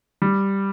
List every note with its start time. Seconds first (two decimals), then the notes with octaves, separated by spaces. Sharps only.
0.22 G3